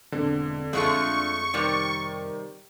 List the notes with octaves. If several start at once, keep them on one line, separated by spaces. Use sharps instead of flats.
E1 D3 C4
F2 G#3 A3 F4 C#6
C3 D#3 G3 D5